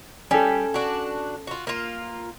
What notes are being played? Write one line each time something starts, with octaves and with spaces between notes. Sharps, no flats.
G3 C#4 A4
D4 F#4
F4 F#4
A#3 F4